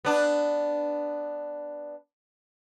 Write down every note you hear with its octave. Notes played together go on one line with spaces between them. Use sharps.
B3 D4